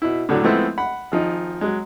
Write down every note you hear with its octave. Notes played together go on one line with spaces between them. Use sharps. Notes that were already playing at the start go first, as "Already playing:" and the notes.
B2 E4
A2 D3 F#3
F3 G#3 A3 B3 C4 E4
F#5 B5
G#1 F3 D#4
F#3 G#3